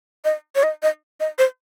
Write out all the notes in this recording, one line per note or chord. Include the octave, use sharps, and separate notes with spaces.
D#5
C#5
D#5
D#5
D#5
C5